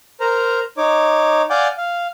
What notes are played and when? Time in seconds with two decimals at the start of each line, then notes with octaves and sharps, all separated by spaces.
0.20 A#4 C5 A#5
0.77 D#4 C#5 D6
1.50 D5 F5 F#5 G#5 D6 G6
1.78 F5